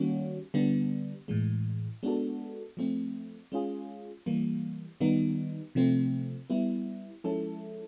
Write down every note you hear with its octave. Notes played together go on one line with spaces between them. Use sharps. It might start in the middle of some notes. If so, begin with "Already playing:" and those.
Already playing: D#3 G3 A#3 C#4 F#4
D3 G3 B3 D4
A2 E3 G#3
G#3 B3 D4 F#4 A4
F3 A3 C4
G#3 C#4 F4 G#4
E3 G3 A#3
D#3 G3 B3 D#4
C3 F3 A3 C4
G3 B3 E4
F3 G#3 C#4 E4 A4